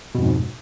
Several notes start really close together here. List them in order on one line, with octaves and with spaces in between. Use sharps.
B2 F2 G#2